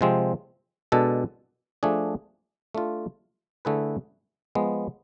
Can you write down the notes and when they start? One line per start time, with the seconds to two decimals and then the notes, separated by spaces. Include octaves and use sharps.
0.01 C3 F3 G#3 C4
0.92 B2 G#3 D4 A4
1.83 F3 A3 D4 G#4
2.75 A3 D4 F4
3.65 D3 A3 E4 G#4 B4
4.55 F3 G#3 B3